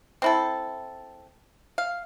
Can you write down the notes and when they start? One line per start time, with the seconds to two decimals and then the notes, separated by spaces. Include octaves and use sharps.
0.22 C4 E4 A4
1.78 F5